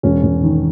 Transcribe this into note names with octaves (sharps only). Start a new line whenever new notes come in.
E1 C#4
E1
D#3